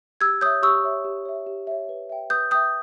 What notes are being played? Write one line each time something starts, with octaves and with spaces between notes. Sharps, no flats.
G4 E6 G#6
C#5 E5 D#6 G6
G4 C#6 E6
C#5 E5
G4
C#5 E5
G4
C#5 E5
B4
E5 G5
B4 D#6 G6
E5 G5 D#6 G6